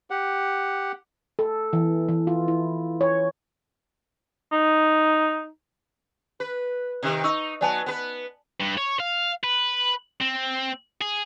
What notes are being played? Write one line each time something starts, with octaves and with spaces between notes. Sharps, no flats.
G4 F#5
A4
E3
E3
F4
E4
C#5
D#4
B4
C3 D#3
D#4 C#6 E6
F#3 B3 D5 G#5 A5
B3 B4
G2
C#5
F5
B4
C4
G#4